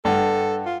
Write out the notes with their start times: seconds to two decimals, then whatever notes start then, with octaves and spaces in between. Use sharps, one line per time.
0.05 G2 A4 F#5 G5
0.66 F4